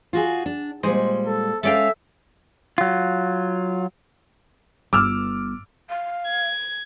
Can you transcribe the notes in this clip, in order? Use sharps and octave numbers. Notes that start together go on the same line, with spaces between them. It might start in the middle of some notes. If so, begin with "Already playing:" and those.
F4 F#4 G#4
D4
A#2 G3 G#3 C5 D#5
A4
G#3 C#4 A4 D5 E5 F5 G5
F#3 F4
G1 D6 E6 F6
F5
G#6